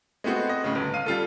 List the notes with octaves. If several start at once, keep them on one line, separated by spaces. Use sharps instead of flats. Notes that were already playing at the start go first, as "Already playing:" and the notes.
G#3 A3 B3 C4 F#4
D#5
A2 C#3
G1
F5 D#7
G3 F4 A4